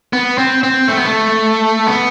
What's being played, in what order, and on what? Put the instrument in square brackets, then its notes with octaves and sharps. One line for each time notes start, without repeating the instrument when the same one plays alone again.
[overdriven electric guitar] B3
C4
C4
A3
B3
A3
B3